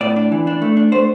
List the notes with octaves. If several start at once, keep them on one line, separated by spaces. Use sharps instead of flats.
A2 D5
D4
E3
D4
A3
D4
A3 C5